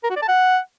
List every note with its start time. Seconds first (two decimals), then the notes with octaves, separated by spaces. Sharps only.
0.04 A#4
0.10 F#4
0.16 D5
0.22 A5
0.28 F#5